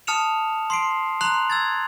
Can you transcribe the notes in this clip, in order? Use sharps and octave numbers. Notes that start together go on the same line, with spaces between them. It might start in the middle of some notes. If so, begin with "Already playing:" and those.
A5 D#6 F6 C#7 E7 F7
C6 C7 D7
A#5 C6 F#6 F7 F#7
E6 G#6 A6